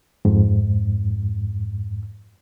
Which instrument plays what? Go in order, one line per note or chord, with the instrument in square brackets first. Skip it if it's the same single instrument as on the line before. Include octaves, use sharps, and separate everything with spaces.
[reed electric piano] F2 G#2